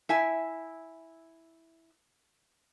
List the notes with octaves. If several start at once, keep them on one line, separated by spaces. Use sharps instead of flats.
E4 E5 G#5